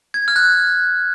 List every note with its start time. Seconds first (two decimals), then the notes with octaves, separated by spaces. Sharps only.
0.14 G#6
0.28 F6
0.36 F#6